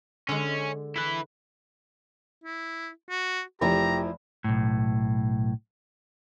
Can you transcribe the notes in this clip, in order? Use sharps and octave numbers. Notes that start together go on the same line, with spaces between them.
D3 G#3 C#4
E4 B4
E4
F#4
F1 F3 E4 G4 A#4 A#5
B1 A2